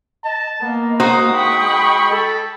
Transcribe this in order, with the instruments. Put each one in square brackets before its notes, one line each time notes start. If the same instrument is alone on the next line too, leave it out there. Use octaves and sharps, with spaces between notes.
[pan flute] D#5 [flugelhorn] A5
[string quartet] A#3 [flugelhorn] B3 [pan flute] D#5
[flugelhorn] G#3 [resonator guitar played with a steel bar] D#4 F#4 C5 [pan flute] D#6
[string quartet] G5 B5 C#6
[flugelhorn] A4